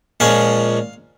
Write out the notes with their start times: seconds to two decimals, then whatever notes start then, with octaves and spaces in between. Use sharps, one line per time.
0.20 A#2 F3 G#3 C#4 F5